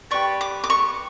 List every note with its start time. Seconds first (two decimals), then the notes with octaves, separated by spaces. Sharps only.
0.11 G4 B4 D5 C#6
0.41 D6
0.64 D6
0.70 C#6